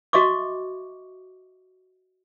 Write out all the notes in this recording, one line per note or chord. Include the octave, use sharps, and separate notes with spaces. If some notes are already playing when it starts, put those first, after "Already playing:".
F#4 D#5 E5 C#6 D6